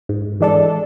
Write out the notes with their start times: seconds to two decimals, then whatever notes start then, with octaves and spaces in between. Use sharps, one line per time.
0.09 G#2
0.40 E3 G#3 D4 A4